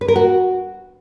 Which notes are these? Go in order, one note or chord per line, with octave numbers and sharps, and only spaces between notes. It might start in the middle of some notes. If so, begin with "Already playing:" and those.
B4
A#4
F#4